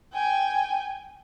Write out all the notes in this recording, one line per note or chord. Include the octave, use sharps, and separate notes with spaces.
G5 G#5